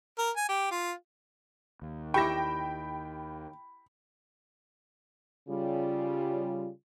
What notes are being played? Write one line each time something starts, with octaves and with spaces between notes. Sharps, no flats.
A#4
G#5
G4
F4
D#2
E4 G4 G5 B5 C#6 A#6 E7
C#3 G3 F4